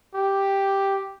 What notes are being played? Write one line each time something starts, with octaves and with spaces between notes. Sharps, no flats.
G4